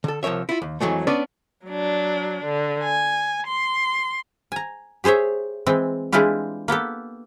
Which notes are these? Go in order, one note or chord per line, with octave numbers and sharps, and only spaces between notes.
D3 A4
C2 F3 A#4 C#5 E5
E4 F4
D#2
F2 E3 F#3 G#3 A3
B3 C#4 D4 B4 D5
F#3 D4
D3
G#5
C6
G#5 A#5
G4 G#4 C5 C#5 E5
E3 G#3 C4
E3 G#3 D4 E4 F4 G4
A#3 B3 G4 A4